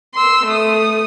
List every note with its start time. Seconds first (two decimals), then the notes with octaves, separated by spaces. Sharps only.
0.14 C6 E6
0.46 A3 D#6